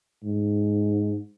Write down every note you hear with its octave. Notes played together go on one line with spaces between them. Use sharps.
G#2